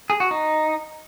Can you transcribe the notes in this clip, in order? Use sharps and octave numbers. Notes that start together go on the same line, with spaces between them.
G#4
F#4
D#4